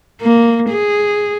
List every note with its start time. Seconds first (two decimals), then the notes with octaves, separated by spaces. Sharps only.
0.21 A#3
0.70 G#4